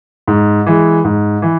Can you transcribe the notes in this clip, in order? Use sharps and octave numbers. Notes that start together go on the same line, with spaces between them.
G#2
E3 G#3
G#2
E3